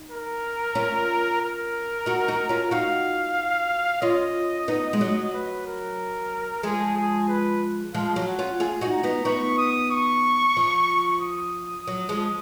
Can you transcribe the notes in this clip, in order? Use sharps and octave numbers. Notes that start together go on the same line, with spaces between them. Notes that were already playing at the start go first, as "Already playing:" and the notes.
Already playing: D#4
A#4
C#4 F4
A#4
D#4 F#4
D#4 F#4
C#4 F4
D#4 F#4 F5
C#4 F4 D#5
B3 D#4
G#3
F#3
B4
A#4
F3 G#3 G#4
G#4
B4
F3 G#3 F5
F#3
F#5
C#4 F4
F4 G#4 G#5
D#4 F#4
A#5
B3 D#4
B3 D#4 C#6
D#6
C#6
F3
D#6
F#3
F3 G#3